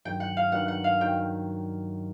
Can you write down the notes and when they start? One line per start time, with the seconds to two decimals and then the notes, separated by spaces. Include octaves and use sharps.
0.05 G2 D#3 F#3 G5
0.20 F#5
0.37 F5
0.52 G2 D#3 F#3 F#5
0.68 F#5
0.84 F5
1.01 D#3 F#3 G5